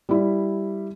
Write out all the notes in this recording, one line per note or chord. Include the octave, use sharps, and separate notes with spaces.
G3 E4